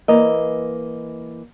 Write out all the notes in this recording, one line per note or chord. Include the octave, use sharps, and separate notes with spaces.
E3 A#3 D#5